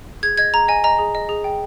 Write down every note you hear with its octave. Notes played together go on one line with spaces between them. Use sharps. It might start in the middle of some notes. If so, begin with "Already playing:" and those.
G#4 G#6
D#5 G#6
G#4 A#5
D#5 G#5
D#5 A#5
G#4
D#5
G#4
G5